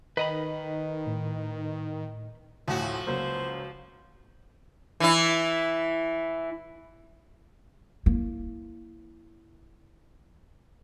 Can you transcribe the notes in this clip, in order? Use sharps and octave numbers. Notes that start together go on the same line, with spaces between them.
D#3 B4 D#5 B5
A2
D2 A2 F3 F#4
C#2 F#3 A#3 C5
E3 E4
A#3 E4